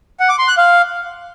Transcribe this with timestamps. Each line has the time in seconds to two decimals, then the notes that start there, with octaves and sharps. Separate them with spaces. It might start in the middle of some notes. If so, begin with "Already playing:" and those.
0.20 F#5
0.29 D6
0.39 C6
0.48 F#6
0.57 F5